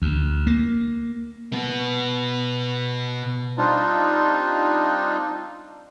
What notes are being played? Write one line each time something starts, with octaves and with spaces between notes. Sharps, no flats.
D2
A#3
B2 B3
G3 C4 D4 D#4 F4